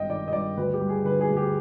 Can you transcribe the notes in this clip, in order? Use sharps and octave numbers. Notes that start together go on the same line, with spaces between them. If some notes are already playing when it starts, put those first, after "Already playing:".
Already playing: G#1 G2 B3 D#5 G5
D#3 D5
D#5
G2 D5
D2 B4
G4
G3
G#4
D3 B4
G#4
D2
G4